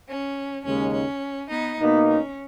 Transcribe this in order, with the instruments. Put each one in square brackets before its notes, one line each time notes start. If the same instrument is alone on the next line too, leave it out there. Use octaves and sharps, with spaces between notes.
[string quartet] C#4
[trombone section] D#2 C#3 G#3 D#4 [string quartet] C#4
[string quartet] C#4
B3 D#4
[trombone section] B2 A#3 D#4 [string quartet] B3
[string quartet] C#4